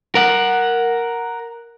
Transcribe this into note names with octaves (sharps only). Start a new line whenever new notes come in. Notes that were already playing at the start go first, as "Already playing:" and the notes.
A#4 F#5